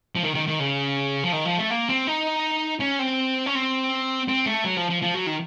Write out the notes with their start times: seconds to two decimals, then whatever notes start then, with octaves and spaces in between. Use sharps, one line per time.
0.16 F3
0.23 D#3
0.35 D#3
0.47 D#3
0.60 C#3
1.24 F3
1.33 D#3
1.45 F3
1.58 A3
1.70 A#3
1.89 C4
2.07 D#4
2.80 C#4
2.99 C4
3.46 C#4
3.55 C4
4.28 C4
4.46 A3
4.64 F#3
4.77 F3
4.90 F3
5.02 F3
5.15 F#3
5.27 D#3